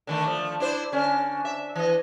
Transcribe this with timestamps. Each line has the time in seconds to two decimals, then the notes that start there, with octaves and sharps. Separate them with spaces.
0.07 D3 D#3 A3
0.26 F3 A3
0.60 D4 E4 C5
0.92 D3 C#4
1.45 E5
1.75 E3 D#5